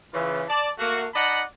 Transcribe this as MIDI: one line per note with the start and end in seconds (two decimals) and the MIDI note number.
0.14 0.43 49
0.14 0.43 52
0.14 0.43 65
0.49 0.69 74
0.49 0.69 81
0.79 1.06 57
0.79 1.06 58
0.79 1.06 66
1.14 1.43 63
1.14 1.43 74
1.14 1.43 75
1.14 1.43 78
1.14 1.43 81
1.14 1.43 83